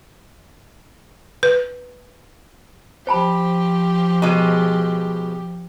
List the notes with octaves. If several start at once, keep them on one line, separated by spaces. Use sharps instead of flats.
B4
F3 G4 C5 A5 B5
B2 G#3